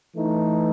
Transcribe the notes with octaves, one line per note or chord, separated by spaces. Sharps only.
E3 A3 D#4